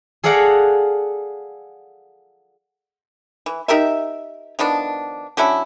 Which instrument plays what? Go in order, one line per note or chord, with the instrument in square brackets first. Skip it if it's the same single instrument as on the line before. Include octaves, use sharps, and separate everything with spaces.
[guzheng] G#4 A4 D5 F5 F#5 A#5
[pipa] E3
D#4 G4 A#4 E5
D#3 F3 B3 D4
F#3 C#4 D4 E4